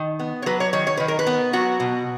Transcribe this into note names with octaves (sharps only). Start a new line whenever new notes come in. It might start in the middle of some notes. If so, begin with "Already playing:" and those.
Already playing: D#3
B3
C#5
F#3 B4
C#5
D#3 C#5
C#5
D#3 B4
A#4
B4
B3
F#3 F#4
B2